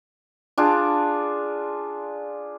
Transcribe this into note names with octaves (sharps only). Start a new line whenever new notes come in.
D4 F4 G#4